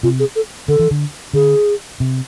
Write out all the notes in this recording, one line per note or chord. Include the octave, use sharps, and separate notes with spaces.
C3 F4
G#4
A4
D3 A4
E3
D3
D3 G#4
C3